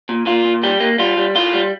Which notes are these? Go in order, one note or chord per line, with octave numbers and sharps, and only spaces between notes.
A#2
A#2 F4
A#2
G3 G4
A#3
G3 F4
G3
A2 F4
G3